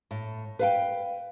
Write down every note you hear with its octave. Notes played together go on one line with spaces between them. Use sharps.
A2
B4 F5 G5